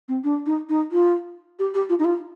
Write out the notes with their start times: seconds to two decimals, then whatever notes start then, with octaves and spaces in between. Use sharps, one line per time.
0.08 C4
0.24 D4
0.46 D#4
0.69 D#4
0.92 F4
1.59 G4
1.74 G4
1.89 F4
1.99 D#4
2.04 F4